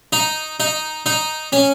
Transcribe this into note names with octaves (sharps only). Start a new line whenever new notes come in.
D#4
D#4
D#4
C#4